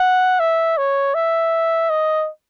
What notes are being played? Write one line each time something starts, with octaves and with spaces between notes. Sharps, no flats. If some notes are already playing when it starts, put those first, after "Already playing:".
Already playing: F#5
E5
C#5
E5
D#5